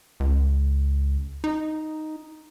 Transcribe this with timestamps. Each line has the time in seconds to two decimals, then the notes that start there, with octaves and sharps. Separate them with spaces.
0.20 C#2
1.44 D#4